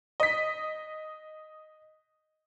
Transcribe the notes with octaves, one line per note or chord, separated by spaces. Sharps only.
D#5 B6